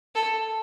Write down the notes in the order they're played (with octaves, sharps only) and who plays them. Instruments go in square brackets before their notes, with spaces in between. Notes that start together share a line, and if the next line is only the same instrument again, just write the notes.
[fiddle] A4